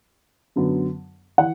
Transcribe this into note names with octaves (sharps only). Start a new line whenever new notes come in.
F#2 D3 F#3 B3
E3 F#5